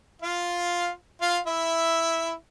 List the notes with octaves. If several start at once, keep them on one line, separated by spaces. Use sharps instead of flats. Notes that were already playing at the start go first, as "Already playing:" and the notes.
F4 F5
F4 F5
E4 E5